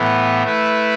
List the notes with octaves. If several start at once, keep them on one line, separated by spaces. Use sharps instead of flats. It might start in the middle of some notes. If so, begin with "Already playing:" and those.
Already playing: A2 E3 B3
A3 E4 B4